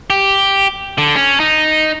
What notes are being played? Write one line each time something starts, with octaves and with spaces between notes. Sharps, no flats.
G4
D3
C#4
D#4